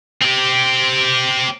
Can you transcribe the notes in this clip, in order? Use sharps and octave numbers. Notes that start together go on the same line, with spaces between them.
C4 G4